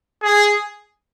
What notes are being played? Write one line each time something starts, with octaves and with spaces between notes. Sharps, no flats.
G#4